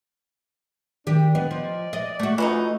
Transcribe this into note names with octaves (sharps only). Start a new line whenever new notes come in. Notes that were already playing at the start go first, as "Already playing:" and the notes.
D#3 D4 G4
B3 D5 D#5
F3
D#5 A6
A3 F#4 F#6
E3 C#4 D#4 F4